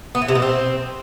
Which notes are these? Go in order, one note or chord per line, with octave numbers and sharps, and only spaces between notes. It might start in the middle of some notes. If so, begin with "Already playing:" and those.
B3
E3
C3
B2
C4